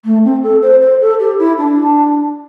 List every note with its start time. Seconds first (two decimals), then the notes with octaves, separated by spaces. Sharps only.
0.05 A3
0.24 C4
0.43 A4
0.62 C5
0.82 C5
1.01 A4
1.20 G4
1.39 E4
1.58 D4